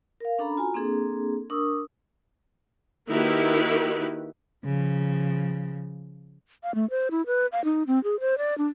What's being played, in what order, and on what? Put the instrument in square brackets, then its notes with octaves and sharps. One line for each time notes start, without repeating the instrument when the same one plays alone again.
[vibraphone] A#4 F5
C#4 D4 A4 A#5 B5
F4 F#4 G#5 A#5
A#3 C4 D4 G#4 A4
D4 A#4 C#6 D#6 E6
[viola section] D#3 A#3 E4 F#4 G4 B4
[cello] C#3 F3
[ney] F5
A3
C5
E4
B4
F5
D#4
C4
G#4
C5
D5
D4